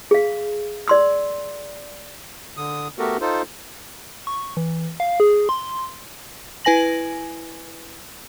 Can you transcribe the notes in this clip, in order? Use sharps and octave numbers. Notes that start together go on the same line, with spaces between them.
G#4 F5
D5 C6 E6
D3 D#6
A3 B3 F#4 G4 A4 A#4
D#4 F4 A4 C5
C#6
E3
F5
G#4
C6
E4 B4 G#5 A#6 F#7